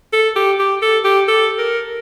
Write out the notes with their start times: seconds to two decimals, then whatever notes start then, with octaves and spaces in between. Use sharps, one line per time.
0.13 A4
0.36 G4
0.59 G4
0.82 A4
1.04 G4
1.28 A4
1.58 A#4